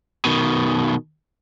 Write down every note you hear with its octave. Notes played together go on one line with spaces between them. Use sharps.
B2 D#3